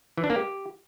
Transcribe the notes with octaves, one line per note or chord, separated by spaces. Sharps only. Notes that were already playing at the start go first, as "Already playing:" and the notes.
E3
D4
A#3
G4